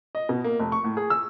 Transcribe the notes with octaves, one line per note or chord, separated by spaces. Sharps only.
D#5
B2
A#3
F1
C#6
A2
G#4
E6